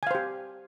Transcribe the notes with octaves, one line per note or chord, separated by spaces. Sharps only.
G4 C5 F5 G#5